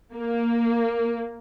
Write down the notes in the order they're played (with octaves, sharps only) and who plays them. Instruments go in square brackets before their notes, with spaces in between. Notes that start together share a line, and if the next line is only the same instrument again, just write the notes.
[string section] A#3